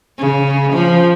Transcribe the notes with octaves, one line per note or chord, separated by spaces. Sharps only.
C#3
F3